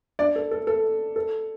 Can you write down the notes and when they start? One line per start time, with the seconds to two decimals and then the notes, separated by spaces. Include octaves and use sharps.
0.19 D4 D5
0.36 A4
0.51 A4
0.67 A4
1.16 A4